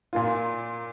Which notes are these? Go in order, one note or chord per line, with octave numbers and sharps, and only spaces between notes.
A#2 A#3 F4